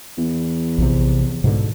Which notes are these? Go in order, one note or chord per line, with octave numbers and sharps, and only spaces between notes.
E2
A#1 C3
G#2 B2 D3